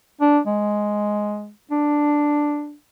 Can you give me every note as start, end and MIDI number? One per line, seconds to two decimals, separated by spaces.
0.21 0.39 62
0.47 1.50 56
1.71 2.74 62